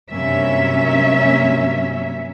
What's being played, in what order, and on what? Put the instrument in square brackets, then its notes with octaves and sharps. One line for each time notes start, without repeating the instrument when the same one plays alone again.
[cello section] G2 C3 F#3 A#3 C#4 E5